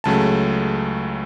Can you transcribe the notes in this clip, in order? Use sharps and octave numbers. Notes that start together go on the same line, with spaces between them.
C#2 C#3 F#3 A3 A5